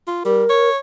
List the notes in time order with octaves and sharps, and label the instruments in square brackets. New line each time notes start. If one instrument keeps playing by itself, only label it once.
[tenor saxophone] F4
[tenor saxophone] G3 [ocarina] A#4
[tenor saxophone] C#5